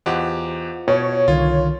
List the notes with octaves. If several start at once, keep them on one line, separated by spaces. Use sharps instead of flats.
E2 F4 G4 C5 D#5 F#5
B2 C#5
C2 D3 D#3 F4